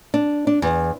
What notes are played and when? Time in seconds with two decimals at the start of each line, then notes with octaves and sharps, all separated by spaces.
0.14 D4
0.47 D4
0.62 E2